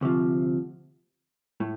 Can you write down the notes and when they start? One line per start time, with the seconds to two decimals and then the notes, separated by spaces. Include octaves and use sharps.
0.01 D2 C3 F3
1.60 A2